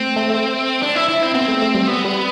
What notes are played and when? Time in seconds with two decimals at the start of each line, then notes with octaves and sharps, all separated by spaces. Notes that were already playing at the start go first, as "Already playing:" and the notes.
Already playing: A3 C4
0.16 A3
0.30 A3
0.82 D4
0.95 E4
1.09 E4
1.22 C4
1.34 B3 C4
1.48 A3
1.62 A3
1.74 G3
1.88 B3
2.04 G3